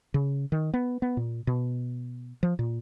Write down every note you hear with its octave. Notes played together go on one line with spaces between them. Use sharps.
C#3
D#3
B3
B3
A#2
B2
F3
A#2